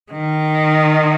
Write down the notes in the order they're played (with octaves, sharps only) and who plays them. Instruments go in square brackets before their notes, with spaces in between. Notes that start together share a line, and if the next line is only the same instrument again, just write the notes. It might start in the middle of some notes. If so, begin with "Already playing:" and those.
[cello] D#3